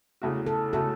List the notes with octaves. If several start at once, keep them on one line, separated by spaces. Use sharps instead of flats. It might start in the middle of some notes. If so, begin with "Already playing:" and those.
E2 C#3 A3 F#4
A4
C#3 A3 F#4 A4